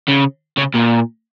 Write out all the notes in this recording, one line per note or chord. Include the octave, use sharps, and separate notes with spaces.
C#3
C#3
A#2